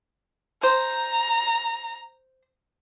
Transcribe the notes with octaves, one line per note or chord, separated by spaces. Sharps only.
C5 A#5